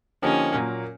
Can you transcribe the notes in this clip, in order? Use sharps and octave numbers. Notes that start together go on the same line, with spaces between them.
D3 F3 A#3 C#4 D#4 G4
A#2 F#3 A#3